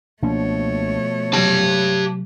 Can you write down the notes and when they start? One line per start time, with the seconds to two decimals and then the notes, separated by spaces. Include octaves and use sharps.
0.22 C#2 B2 F3 A3 A#3 D4 C#5
1.33 C3 F#3 G4 A5